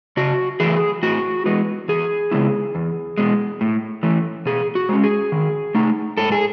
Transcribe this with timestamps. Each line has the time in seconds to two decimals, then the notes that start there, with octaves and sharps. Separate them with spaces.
0.17 C#3 F#4
0.60 E3 A3 G#4
1.03 A2 F#4
1.46 E3 G#3 B3
1.88 E2 G#4
2.31 C#3 G#3 B3 E4
2.75 E2
3.18 B2 G#3
3.61 A2
4.03 E3 A3
4.46 B2 G#4
4.75 F#4
4.89 G#3 C#4
5.04 G#4
5.32 D#3
5.75 A3 D#4
6.17 G#2 A4
6.32 G#4